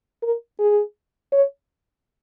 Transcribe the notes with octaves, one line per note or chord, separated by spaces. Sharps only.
A#4
G#4
C#5